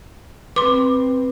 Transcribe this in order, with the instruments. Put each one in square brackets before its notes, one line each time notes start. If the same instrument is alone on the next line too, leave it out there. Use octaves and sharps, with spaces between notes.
[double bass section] C4 [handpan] B4 [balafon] C6 D6